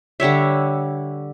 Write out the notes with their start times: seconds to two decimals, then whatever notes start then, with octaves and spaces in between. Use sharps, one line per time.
0.20 D3 G3 C#5 E5